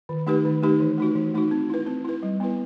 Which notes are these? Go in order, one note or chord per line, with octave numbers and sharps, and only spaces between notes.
D#3
A3 D#4 G4 B4
D#3
A3 D#4 G4 B4
E3
A3 D#4 F#4
E3
A3 D#4 F#4
C4
E4 B4
C4
E4 B4
G3
B3 E4 B4